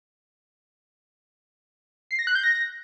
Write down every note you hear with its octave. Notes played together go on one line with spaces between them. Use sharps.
C7
A#6
F#6
G6
A#6